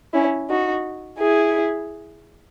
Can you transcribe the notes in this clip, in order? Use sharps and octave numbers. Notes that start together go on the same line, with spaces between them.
C#4 E4
D#4 F#4
E4 G#4